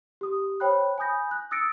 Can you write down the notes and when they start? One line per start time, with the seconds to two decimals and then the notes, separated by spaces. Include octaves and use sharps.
0.21 G4 D#6
0.60 C5 C#5 G5 B5 F#6
0.98 G#5 B5 D#6 G6 A#6
1.31 F#6
1.51 D#6 E6 A6 A#6 C#7 D7